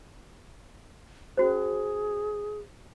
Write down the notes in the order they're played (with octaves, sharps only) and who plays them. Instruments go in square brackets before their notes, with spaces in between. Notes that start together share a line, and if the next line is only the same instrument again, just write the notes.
[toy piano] C#4 F#4 C5 [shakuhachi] G#4